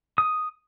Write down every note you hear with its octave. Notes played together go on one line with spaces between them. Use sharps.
D#6